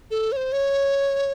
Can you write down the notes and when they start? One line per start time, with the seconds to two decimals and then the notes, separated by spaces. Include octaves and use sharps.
0.11 A4
0.32 C#5
0.37 C5
0.52 C#5